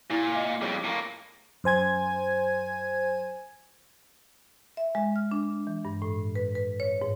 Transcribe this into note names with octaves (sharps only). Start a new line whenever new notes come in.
A#2 E4 G4 D6
D#5 F5 G#5
F2 G3 G#4 C#5
A2 A#3
F#2 C5 G#5 G#6
E5
G#3
F6
D4
E3
G2
A2
B4
B4
C#5
G#2